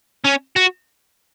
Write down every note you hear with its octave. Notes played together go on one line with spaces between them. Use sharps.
C#4
F#4